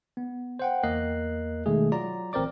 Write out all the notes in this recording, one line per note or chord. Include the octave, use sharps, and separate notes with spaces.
B3
C5 F#5 G5
E2 A#3 A#4 D#5 F#6 C7
B2 D#3 G#3 A3 G#4
F#3 F4 D5 A#5
A1 C4 A#4 C5 D5 D6